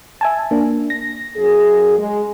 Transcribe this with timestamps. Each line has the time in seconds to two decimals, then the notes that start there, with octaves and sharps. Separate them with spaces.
0.21 E5 G#5 A5
0.51 A#3 D4
0.90 A#6
1.35 F#2 G#4
1.97 G#3